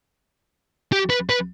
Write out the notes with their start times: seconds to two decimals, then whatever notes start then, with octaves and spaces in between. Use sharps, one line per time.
0.93 G4
1.10 B4
1.29 B4